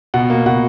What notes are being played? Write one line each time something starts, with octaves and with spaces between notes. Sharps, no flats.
B2 F#5
A#3
B2 F#5